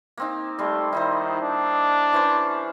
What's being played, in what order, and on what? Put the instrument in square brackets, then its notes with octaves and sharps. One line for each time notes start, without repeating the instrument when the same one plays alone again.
[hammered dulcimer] A#3 C4 D#4
[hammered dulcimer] G3 C6 [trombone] A3
[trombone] D#3 [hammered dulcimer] D#4 E4 C5
[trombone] D4
[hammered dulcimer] E3 C#4 C5